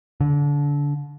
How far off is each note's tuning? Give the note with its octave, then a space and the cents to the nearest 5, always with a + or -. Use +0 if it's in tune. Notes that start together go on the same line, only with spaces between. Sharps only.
D3 -25